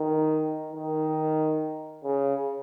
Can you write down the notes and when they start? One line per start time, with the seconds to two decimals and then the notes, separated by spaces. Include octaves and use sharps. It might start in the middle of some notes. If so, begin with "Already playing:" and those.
Already playing: D#3
0.73 D#3
2.04 C#3